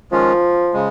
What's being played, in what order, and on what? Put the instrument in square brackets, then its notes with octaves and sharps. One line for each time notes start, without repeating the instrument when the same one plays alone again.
[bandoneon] D#3 G#3 C#4 F4 [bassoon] F3
[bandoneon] C#3 G#3